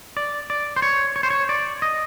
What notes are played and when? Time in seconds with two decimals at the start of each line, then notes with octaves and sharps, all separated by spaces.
0.17 D5
0.50 D5
0.76 C5
0.82 C#5
1.16 C#5
1.23 C5
1.30 C#5
1.49 D5
1.82 D#5